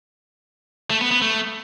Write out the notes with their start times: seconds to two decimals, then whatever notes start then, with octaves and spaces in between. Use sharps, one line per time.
0.91 A3
1.01 B3
1.11 B3
1.21 A3